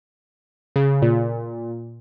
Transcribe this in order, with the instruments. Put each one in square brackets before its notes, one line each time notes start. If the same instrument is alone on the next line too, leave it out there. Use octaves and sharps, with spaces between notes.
[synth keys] C#3
A#2